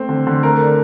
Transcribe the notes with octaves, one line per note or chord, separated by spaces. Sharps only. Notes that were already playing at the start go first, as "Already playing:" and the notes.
Already playing: A3 C4 C5
D3
D3
A3 A#4
D4